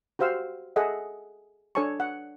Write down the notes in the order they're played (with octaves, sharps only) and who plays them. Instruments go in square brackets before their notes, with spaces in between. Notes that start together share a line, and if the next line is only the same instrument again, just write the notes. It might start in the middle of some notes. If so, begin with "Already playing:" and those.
[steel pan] F#4 G4 C5 F5 E6
G#4 A4 D#5 E5 F#5
D4 A4 C#5 G#5 A5 C#6
F#5